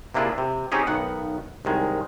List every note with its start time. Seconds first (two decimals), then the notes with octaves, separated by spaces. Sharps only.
0.14 C3 A#3 D4 E4 F4 G#4
0.38 C3
0.72 C4 C#4 D#4 G4 G#4
0.87 B1 D#3 B3 F#5
1.65 C2 F#2 D#3 G#3